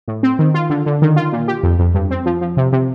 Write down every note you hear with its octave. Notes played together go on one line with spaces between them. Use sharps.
A2
C4
D#3
F4
D3
D3
D#3
F4
A#2
G4
F2
F2
G2
C4
F3
F3
C3
C3